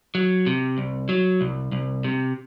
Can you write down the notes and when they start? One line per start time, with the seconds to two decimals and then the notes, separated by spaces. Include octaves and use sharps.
0.15 F#3
0.46 C3
0.78 C2
1.09 F#3
1.41 C2
1.72 C2
2.04 C3